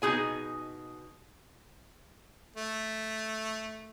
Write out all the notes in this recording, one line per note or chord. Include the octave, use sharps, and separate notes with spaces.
B2 D#4 F#4 G#4 G#5
A3